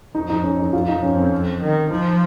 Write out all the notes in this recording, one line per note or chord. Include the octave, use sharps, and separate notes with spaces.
F2 D#4
D#4
C#4
D#4
F4
D#4
F2 C#4
C4
D#3
F3 D#4